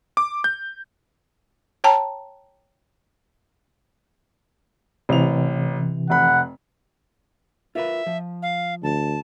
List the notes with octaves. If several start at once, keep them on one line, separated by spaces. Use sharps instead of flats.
D6
G6
C#5 G5 A5 A#5
A1 C3 E3 F7
F1 F#5 B5
F4 A#4 B4 E5
F3
F5
D2 A5